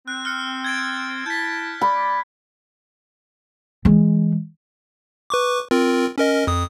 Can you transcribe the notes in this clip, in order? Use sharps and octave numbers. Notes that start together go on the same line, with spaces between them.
C4 F#6
F6 F#6 C#7
G#6 A6 D7
E4 A5 G6 B6
D5 B5
E3 G#3
B4 C#6 D6
C4 F4 A#4
C#4 A#4 D#5
F2 D#6